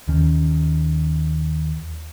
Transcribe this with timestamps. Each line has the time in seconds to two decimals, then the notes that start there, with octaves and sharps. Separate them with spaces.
0.08 D#2 D#3 C#4